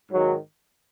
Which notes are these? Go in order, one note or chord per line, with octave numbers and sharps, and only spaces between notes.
G#2 D#3 F#3